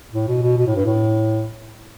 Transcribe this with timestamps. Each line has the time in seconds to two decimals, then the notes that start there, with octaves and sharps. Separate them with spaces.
0.14 A2
0.28 B2
0.42 B2
0.57 B2
0.67 A2
0.76 G2
0.85 A2